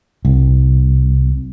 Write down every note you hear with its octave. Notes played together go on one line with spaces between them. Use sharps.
C2